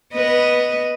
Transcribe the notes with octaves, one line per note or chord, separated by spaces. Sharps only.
B3 B4 D#5